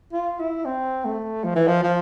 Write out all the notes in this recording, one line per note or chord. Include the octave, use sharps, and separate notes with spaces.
F4
E4
C4
A3
F3
E3
F3
F3